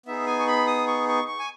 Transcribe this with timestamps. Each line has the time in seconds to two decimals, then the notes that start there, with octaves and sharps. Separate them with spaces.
0.06 B3 D#4 G#4 E5
0.26 G#5
0.39 C#6
0.47 B5
0.67 D#6
0.87 C#6
1.08 C#6
1.28 C#6
1.39 G#5